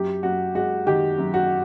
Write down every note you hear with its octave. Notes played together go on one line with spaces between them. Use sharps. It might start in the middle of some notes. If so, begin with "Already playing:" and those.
Already playing: F#2 G4
F#2 F#4
G#3 F#4
D#3 G4
F#2
F#4